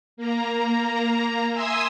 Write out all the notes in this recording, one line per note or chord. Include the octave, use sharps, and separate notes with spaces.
A#3 A#5
E5 G#5 C6 D#6 E6